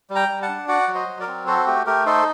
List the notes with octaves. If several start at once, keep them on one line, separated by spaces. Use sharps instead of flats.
G3
G5 A#5
G3
F#5 A5
D4
F#4 D5 F#5
F#3
C5 D#5
F#3
A#4 D5
C4
F#4 A4 C5
A3 G4
A3 G4 A#4
D#4 A4 C5